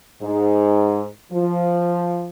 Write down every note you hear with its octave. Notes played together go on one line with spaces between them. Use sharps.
G#2
F3